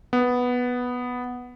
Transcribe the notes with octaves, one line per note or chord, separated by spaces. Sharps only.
B3